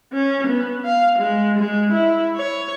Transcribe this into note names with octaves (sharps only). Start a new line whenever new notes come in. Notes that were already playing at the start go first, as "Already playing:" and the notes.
C#4
B3
F5
G#3
G#3
E4
C#5